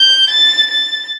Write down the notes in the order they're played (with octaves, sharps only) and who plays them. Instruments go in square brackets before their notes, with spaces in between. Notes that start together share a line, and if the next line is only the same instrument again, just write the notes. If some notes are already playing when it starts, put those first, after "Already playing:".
Already playing: [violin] G6
A6
A6